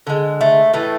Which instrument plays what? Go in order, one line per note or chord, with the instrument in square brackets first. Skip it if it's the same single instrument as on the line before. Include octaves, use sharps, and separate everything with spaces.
[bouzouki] D3 G#3
A3
A2 E3 A3